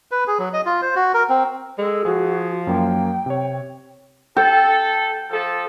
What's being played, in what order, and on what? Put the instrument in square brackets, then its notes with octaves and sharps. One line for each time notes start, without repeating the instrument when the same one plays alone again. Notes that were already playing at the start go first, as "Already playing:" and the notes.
[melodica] B4
G#4
F#3
D#5
F4
C5
F#4
A#4
C4
[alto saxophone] G#3 [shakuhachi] A4
[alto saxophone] F3 [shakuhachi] F#4 [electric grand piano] G#4
[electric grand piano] F#2 A#3 [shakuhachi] G5
[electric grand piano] C3 C#5
[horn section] A4 [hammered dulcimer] G5
[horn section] F3 A4